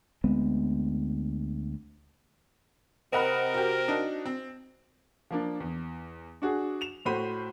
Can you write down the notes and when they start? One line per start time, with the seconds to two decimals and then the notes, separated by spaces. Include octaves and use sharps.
0.24 D2 G#3 B3 C4
3.13 C3 C4 A#4 D#5 F#5 B5
3.54 F#4 G4
3.88 D4 D#4 F#4
4.26 C4
5.31 F3 A#3 D4
5.60 E2
6.42 D4 F#4 G#4
6.81 E7 F7
7.05 A2 F#4 C5 B5 D#7